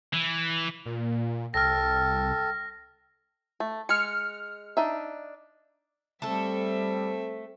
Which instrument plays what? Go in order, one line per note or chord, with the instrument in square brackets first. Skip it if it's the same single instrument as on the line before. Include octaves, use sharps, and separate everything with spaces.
[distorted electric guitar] E3
[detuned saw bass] A#2
[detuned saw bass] C2 [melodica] A4 [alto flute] G5 [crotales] F6 A#6
[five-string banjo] A3
[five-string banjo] G#3 [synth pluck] F6 C#7
[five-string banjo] D4 D#4 E5
[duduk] G3 [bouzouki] A3 A4 [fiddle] C4 E5